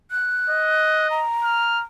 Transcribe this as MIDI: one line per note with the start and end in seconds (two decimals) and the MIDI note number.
0.11 1.08 90
0.50 1.24 75
1.10 1.81 82
1.44 1.83 89